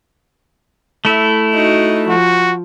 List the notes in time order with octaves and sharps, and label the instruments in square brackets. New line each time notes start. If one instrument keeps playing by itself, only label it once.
[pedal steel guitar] A3 E4
[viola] D#4 F#4
[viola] F3 [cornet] F#4